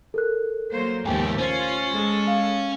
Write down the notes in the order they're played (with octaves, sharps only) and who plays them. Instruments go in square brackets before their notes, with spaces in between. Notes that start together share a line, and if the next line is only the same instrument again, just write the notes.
[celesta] A4 A#4 F#6
[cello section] F#3 A#3 C5
[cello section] D#2 A3 G4 [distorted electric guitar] G#2 F3 [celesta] G5 G#5
[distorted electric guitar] C#4 [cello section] F4 [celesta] C5
[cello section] G#3 A4
[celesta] F5